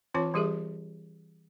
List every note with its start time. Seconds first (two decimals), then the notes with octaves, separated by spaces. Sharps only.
0.14 E3 C4 F4 C#5 A5 D6
0.34 E3 G3 G4 G#4 A#4 E5